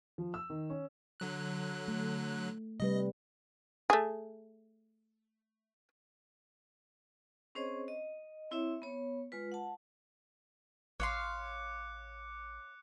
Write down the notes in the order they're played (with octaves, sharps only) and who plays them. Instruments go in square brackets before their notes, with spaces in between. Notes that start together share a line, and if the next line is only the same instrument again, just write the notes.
[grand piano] F3
E6
D#3
C#4
[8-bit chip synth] D3 F#3 F#6
[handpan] A3
[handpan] C3 G3 B4 [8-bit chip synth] D#5
[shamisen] A3 G#4
[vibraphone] C4 C#4 G#4 C5 C#5 D#5
D#5
C4 E4 C#5 E5
B3 C#5
G#3 F4 B4
F#5 A5
[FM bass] A1 [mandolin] C#5 F5 C6 [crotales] D6 F#6 C#7